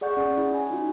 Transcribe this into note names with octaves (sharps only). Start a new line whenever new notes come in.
G#4 D5 F#5 C#6 G6
C#4 G#4
E4
G#5
D#4 F4 F#4